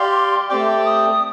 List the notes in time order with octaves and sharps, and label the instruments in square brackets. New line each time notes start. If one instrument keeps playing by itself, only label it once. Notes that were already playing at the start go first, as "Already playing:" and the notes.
Already playing: [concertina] G4 D5 F5 [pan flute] C6
[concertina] A3 C4 G4 D5 G5 [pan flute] D6
[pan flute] D#6